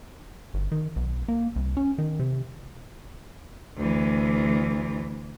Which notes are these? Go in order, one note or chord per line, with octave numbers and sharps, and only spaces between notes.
G1
D#3
B1
A#3
C2
C#4
D#3
C3
D2 E3